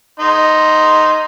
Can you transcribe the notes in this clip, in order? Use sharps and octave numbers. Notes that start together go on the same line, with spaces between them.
D#4 C6